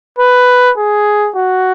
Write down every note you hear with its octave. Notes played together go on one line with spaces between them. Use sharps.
B4
G#4
F#4